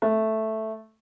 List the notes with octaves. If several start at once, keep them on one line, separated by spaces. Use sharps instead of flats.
A3